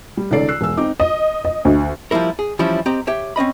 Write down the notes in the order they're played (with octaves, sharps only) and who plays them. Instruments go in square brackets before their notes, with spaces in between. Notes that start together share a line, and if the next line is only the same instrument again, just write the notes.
[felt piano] G3
C#2 D#3 A4 D5 C7
E6 F#6 C7
E1 E6
C4 D#4 D6
[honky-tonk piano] D#5
D#5
D2
[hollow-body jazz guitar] F3 G3 A#3 E4 A#4
G#4
E3 F3 G3 C#4 E4 G4
C4 G4 D#5 A#5
G4 C#5 E5
C4 C#4 D#5 B5